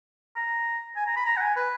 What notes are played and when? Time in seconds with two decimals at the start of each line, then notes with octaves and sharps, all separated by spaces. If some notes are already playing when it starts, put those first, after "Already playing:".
0.36 A#5
0.96 G#5
1.07 A#5
1.16 B5
1.26 A#5
1.37 F#5
1.41 G#5
1.57 B4